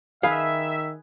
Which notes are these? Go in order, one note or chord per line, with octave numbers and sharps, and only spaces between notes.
D#3 G#4 B4 E5 F5